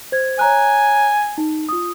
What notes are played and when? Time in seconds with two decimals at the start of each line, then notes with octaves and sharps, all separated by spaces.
0.12 C5 G#6
0.39 C#5 G#5 A#5 F#6
1.38 D#4
1.69 F4 D#6